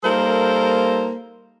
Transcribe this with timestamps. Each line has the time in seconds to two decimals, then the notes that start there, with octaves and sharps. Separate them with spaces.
0.04 G3 A#3 D#4 A4 A#4 C5